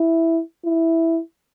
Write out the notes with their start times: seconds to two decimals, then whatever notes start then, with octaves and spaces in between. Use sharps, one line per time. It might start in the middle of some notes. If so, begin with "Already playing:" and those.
Already playing: E4
0.65 E4